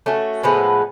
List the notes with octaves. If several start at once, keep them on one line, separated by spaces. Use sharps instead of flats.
A3 C#4 F#4
A2 F3 G#3 B3